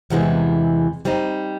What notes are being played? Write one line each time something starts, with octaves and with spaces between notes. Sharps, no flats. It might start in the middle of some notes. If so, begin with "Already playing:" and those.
E2 C3 E3 G#3 B3
G3 C4 D#4